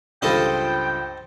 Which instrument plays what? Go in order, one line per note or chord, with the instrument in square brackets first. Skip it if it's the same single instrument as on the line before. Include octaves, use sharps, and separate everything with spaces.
[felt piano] C#2 G2 F4 [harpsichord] A4 C5 D#5 [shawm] G5